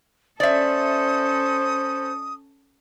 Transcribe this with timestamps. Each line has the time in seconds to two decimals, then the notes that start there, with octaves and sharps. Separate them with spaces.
0.40 C#4 A4 C5 D5 E5 D#6